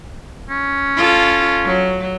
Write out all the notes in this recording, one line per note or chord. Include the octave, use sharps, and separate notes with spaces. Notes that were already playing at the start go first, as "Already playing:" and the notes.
C#4
F4 A4
F#3